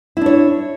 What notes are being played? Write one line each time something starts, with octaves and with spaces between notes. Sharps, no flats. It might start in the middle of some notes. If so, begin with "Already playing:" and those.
D4 E4 C#5